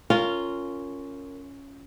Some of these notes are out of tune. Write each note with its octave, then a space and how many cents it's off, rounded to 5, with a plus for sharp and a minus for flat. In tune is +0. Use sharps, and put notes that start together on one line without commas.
C#4 +5 F4 -5 A#4 -20